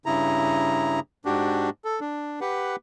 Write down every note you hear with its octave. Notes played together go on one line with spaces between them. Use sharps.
G2 C#3 E4 A#5
G#2 D4 F#4 G4
A4
D4
G4 B4 F#5